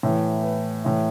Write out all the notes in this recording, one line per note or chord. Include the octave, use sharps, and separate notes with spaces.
A2 E3
B4
A2 E3